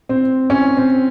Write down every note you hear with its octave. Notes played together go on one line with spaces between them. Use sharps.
C4
C#4
C4